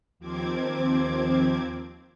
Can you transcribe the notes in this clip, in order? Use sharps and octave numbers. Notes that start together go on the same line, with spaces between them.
D#2 F3 C4 D6 G#6